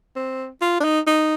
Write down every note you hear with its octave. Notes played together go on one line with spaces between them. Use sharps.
C4
F4
D4
D#4
D#4